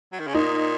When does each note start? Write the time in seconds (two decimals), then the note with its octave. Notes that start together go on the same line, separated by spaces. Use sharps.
0.12 F#3
0.20 D#3
0.27 C#3
0.34 A#2 D#4